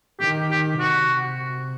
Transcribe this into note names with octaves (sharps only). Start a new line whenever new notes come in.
D#3 G4
G4
C3 F#4